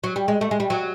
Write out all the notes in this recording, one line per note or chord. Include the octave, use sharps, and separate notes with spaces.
F#3
G3
G#3
A3
G#3
G3
F#3